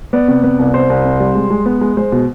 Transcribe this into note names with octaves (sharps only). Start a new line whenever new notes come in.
B3 D5
C3
B3
C2
C3 C5
C2
C3
G3
G#3
G#3
B3
G#3
G#3 C5
B2